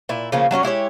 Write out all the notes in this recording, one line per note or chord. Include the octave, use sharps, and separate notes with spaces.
A#2 E4
C#3 F3 A#3 C#4
F#3 A3 C#4 F#4
G#3 E4 G4 C#5